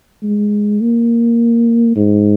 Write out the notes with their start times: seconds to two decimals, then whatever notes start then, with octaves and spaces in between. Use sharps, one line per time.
0.23 G#3
0.81 A#3
1.96 G#2